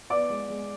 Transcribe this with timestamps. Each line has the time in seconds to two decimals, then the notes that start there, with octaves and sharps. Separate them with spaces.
0.10 B3 D5 D6
0.30 G#3
0.50 G#3